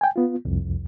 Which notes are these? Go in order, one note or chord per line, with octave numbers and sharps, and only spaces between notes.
G5 G#5
B3 F4
C2 F2